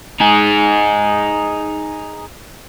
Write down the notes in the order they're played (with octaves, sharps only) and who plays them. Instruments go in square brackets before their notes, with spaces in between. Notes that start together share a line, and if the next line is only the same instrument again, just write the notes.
[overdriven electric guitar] D#4 G#4